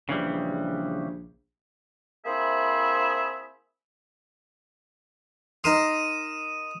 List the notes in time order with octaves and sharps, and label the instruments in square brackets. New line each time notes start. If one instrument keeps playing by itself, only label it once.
[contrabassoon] A#1 [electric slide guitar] C#3 E3 G3
[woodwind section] A#3 C4 E4 G#4 C5 E5
[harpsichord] D#4 A#4 C6 [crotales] D#6 D#7 E7